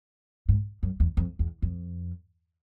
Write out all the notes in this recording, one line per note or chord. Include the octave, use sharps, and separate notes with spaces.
G#2
F#2
E2
F2
E2
F2